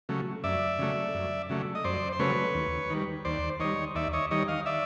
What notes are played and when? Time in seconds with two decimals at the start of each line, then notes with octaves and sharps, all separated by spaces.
0.09 C#3 F#3 A3
0.44 F#2 D5 E5
0.79 C#3 F#3 A3
1.14 F#2
1.49 C#3 F#3 A3
1.75 D#5
1.84 F#2 C5 D5
2.12 C5
2.19 C#3 F#3 A3 B4 C#5
2.55 D#2
2.90 D#3 G3
3.25 D#2 C5 D5
3.60 D#3 G3 C#5 D#5
3.95 D#2 D5 E5
4.13 C#5 D#5
4.31 D#3 G3 C#5 D#5
4.48 D#5 F5
4.66 D5 E5